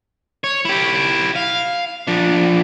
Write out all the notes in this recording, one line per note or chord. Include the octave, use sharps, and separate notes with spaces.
C#5
E4 G4
F5
F3 D4